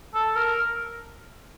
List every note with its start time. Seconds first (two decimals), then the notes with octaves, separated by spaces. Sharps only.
0.15 A4
0.36 A#4